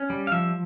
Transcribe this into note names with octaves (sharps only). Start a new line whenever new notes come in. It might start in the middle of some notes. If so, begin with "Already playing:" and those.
Already playing: C#4
G3
F5
F3 E5